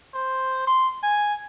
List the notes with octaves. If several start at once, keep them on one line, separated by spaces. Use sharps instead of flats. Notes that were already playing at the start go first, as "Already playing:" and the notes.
C5
C6
G#5